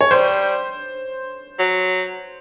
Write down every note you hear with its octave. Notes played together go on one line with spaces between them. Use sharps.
C#5
G3 C5
F#3